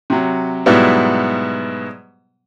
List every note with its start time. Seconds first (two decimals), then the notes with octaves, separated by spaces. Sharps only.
0.10 C3 F#3
0.66 G#2 B2 F#3 G3 B3 E4